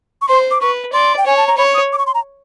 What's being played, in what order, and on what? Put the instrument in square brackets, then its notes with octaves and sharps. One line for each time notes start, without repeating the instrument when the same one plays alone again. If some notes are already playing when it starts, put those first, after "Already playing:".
[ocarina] C#6
[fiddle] C5 [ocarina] C6
[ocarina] D6
[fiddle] B4 [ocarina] C#6
[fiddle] D5 [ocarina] C6
[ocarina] G5
[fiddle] C#5 [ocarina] G#5
[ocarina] A5
A#5
[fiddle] C#5 [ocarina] B5
[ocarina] D#6
D6
C#6
C6
A#5